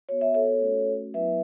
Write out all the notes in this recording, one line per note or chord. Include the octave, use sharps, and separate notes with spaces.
B3 F#4 C#5
E5
A4 C#5
A3 C#4 F#4
F#3 B3 E4 B4 E5